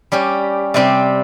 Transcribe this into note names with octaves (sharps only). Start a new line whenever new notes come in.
G3 C#4 G4
C3 G3 C4 G4